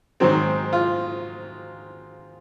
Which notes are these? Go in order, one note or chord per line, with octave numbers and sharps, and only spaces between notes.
G#2 D#3 F#3 C4
F4